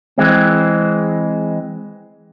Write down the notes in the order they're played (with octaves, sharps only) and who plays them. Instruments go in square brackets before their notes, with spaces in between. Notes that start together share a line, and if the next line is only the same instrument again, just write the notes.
[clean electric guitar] E3 G#3 C4